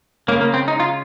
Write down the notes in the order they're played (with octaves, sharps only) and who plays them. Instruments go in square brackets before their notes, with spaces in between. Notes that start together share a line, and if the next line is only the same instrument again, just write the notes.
[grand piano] C#3 G#3 C#4 [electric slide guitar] A#3
[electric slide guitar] A#3
C4
D#4
F4